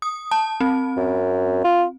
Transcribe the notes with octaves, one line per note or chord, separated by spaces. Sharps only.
D#6
A5
C4
F#2
F4